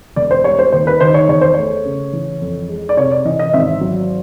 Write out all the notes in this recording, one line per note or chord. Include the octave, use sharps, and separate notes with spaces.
E1 D5
C5
G3 C#5
C5
D#2 C5
B4
D#3 C5
C#5
E2 C#5
C5
A3 C#5
C#3
E3
F2
G#3
D5
C3 C#5
D5
E3 D#5
D#5
G#1 E5
F#3